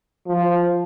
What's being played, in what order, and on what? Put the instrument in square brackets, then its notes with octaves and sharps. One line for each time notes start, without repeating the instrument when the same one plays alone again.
[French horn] F3